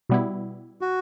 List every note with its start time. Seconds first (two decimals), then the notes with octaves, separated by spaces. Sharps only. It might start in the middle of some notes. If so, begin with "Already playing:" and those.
0.09 B2 G3 B3 E4
0.81 F#4